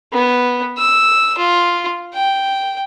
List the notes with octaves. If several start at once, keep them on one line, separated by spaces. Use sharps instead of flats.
B3
E6
F4
G5